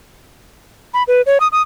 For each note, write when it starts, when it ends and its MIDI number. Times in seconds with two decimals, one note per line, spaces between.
0.94 1.03 83
1.08 1.22 71
1.26 1.38 73
1.40 1.48 87
1.52 1.62 87